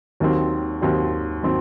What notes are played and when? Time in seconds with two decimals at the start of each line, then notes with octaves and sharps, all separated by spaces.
0.20 D#2 D#3 F#3 C4
0.81 D#2 D#3 F#3 C4
1.43 D#3 F#3 C4